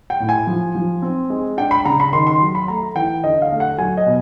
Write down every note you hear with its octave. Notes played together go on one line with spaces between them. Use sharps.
G5
A2
G#5
F3
F3
C4
G#3
D4 G5
B5
C#3 A#5
B5
D#3 C6
C6
F#3
B5
A3 A#5
E3 G5
D3 D#5
F5
A3
F#5
F#3 G#5
D#5
B2